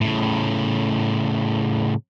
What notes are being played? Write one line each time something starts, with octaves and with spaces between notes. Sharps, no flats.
A2 C#3